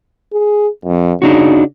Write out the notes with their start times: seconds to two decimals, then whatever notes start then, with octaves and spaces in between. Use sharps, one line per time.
0.33 G#4
0.85 F2
1.22 C#3 D4 D#4 F#4